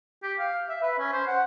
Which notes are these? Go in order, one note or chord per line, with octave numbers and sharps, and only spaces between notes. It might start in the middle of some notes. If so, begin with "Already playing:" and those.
G4
F5
E5
B4
C#4
C5
F#5